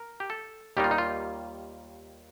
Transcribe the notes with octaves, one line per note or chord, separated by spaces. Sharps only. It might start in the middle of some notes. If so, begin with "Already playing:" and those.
Already playing: A#4
G4
A4
D#2 D#3 G3 A#3 D#4 G4
F4
D#4
F4